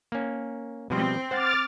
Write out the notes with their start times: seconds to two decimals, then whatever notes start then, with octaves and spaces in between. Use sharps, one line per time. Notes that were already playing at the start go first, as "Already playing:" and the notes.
0.12 A#3 C#4
0.90 B2 F3 G3 C4
1.31 C5 F#5 D6 F6 A6